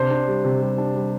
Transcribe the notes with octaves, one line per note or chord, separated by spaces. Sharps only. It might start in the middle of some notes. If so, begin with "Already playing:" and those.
Already playing: C3 D4 C5
D4
G3
C3
G3
D4
G3